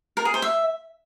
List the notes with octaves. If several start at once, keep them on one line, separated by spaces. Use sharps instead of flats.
A#4
G#4
C5
E5